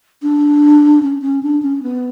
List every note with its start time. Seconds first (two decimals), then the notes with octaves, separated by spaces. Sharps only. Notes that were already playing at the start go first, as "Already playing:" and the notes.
0.22 D4
1.03 C#4
1.22 C#4
1.43 D4
1.62 C#4
1.83 B3